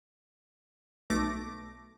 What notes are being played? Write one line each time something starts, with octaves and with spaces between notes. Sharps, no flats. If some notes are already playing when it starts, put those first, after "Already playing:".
B1 A3 D6 A#6